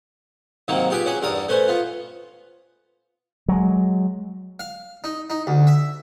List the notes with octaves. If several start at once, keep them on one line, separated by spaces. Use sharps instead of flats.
G#2 C3 D#3 F#3 A#3
F4 G4 G#4 B4 D6
C#4 F#4 G#4
E2 G2 A#4 D5 D#6
A3 C#4 B4 C5 G#5
B3 F4
F#3 G#3
F5
D#4
D#4
D2
E5